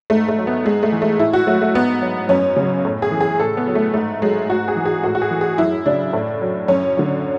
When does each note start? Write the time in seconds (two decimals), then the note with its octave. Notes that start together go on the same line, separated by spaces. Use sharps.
0.10 G#2 A3
0.29 A3
0.38 F#3
0.47 B3
0.65 G#2 G#3
0.83 A3
0.92 E3
1.02 A3
1.19 A2 E4
1.33 F#4
1.47 F#3 A3
1.62 A3
1.74 G#2 B3
2.02 F#3
2.29 F#2 C#4
2.56 C#3 F#3
2.85 A2
3.02 G#4
3.11 E3
3.21 G#4
3.39 A2 A4
3.57 B3
3.67 F#3
3.75 A3
3.94 G#2 A3
4.22 F#3 G#3
4.49 G#2 F#4
4.68 G#4
4.76 E3
4.85 G#4
5.03 A2 F#4
5.15 F#4
5.22 G#4
5.31 E3
5.41 G#4
5.58 F#2 E4
5.86 C#3 F#3 D4
6.13 A2
6.41 F#3
6.68 F#2 C#4
6.97 D3 F#3